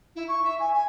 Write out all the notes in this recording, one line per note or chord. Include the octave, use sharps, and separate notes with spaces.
E4
C#6
E5
G#5
G#5